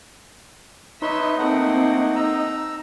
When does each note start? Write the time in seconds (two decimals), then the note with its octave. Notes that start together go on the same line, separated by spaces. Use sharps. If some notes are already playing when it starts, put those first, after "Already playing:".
1.02 D#4 B4 C#5 E5 C6
1.39 A3 A#3 C4 F#5
2.15 A#5 E6